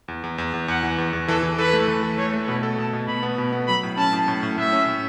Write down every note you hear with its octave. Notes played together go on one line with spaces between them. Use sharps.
E2
E2
E2
E2
E2 F#5
E3
E2
E2
E3 A4
E3
A4 B4
A3
E3
A4
A3 C#5
A3
B2 B4
A4
B2 A5
B2
B2 B5
B3
B2
B3
F#3 B5
A2
C#4 A5
A2
A2
A2
A2 E5
C#4
A2